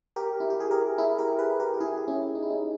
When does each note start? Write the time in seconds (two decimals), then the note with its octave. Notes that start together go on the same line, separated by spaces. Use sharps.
0.16 G4 A#4
0.40 E4
0.50 G4
0.60 G#4
0.71 G4 A#4
0.98 E4 G#4
1.18 G4 A#4
1.39 G#4 B4
1.60 G4 A#4
1.74 G4
1.80 E4 G#4
1.97 G4
2.08 C#4 E4
2.35 D#4
2.43 E4
2.50 D#4